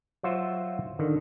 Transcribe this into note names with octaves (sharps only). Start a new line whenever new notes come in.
F#3 F4 F#4 C5 E5
D3 D#3